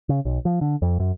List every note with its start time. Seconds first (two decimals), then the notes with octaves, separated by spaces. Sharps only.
0.09 C#3
0.25 B1
0.45 F3
0.61 D3
0.82 F2
1.00 F#2